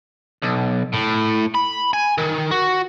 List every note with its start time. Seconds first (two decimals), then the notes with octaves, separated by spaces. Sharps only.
0.43 B1
0.93 A2
1.54 B5
1.93 G#5
2.18 D#3
2.51 F#4